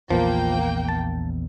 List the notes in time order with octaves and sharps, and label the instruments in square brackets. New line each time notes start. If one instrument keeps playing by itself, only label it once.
[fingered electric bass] A#1 E2 [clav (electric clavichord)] F3 [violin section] A#3 G5
[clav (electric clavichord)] A5